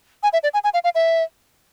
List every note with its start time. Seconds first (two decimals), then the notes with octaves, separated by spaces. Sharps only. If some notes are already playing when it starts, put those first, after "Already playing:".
0.23 G#5
0.33 E5
0.43 D5
0.54 G#5
0.64 G#5
0.74 F5
0.84 F5
0.95 E5